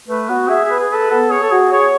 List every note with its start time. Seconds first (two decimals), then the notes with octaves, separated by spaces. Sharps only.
0.08 A3 B4
0.28 B3 F#4
0.49 G#4 E5
0.64 G#4
0.69 B4
0.79 G#4
0.89 A4 B4
1.10 B3 A4
1.30 G#4 C#5
1.42 A4
1.51 F#4 G#4
1.71 G#4 C#5